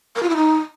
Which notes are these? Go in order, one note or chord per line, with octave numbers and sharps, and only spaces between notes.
A#4
F4
E4
D#4